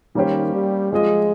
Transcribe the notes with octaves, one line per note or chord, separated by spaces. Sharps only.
D#3 G3 A#3 C#4 G4 C5
G3
F3 G#3 C4 F4 G#4 D#5